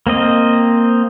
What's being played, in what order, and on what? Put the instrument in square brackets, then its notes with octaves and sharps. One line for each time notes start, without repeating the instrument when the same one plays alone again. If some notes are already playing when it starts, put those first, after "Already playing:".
[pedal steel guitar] A#3 C4 D#5